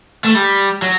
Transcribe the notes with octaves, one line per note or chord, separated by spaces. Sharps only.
A3
G3
F#3